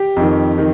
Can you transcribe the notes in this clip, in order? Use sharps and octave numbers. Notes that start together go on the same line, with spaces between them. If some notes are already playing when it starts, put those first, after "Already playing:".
Already playing: G4
F2 D#3
D#3